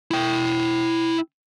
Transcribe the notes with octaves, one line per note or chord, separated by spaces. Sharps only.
E4 G5